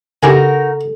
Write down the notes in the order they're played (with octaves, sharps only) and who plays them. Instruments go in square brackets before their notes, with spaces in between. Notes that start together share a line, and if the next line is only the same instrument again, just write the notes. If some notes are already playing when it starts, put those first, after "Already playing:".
[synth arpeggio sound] C#3 [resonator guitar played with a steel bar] D#4 F#4 A#4 [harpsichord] E4 G4 G#5 [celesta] A4